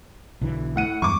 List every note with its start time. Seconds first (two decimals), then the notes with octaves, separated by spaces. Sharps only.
0.41 B1 D3 E3
0.76 A2 F#5 D#7
1.02 E2 G2 G#3 C#6 D6